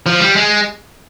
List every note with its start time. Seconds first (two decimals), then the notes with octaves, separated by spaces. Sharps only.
0.06 F3
0.20 G3
0.36 G#3